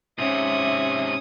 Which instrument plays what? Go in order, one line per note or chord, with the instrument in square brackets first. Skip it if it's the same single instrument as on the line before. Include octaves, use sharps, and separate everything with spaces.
[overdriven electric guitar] G#2 C3 [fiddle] C#4 D#6 [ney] E5